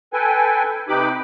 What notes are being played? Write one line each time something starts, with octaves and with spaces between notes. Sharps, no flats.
A4 B4 G5 G#5
C3 D#4 G4 B4 B5 D6